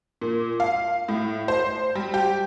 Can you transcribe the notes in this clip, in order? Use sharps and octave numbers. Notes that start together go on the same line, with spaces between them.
A#2
F5
A2
C5
G3
G4